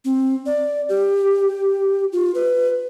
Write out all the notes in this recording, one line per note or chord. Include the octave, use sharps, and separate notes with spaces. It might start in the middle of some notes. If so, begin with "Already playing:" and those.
C4
D5
G4
F4
B4